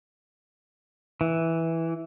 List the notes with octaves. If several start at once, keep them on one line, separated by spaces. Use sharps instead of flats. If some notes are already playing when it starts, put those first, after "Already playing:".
E3